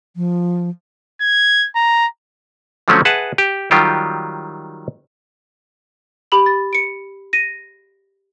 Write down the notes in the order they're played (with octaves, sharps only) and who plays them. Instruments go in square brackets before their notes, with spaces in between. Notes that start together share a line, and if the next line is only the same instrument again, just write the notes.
[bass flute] F3
[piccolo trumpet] G#6
A#5
[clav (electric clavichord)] D3 F3 F#3 A3 C4 C#4
G#4 B4 E5 F#5 A5
G4
D#3 F#3 G3 F4 G4
[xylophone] G4 B5 F#7
A6
C#7 D7
A#6 D#7